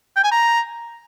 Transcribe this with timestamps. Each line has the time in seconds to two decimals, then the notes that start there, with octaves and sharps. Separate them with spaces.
0.16 G5
0.24 G#5
0.31 A#5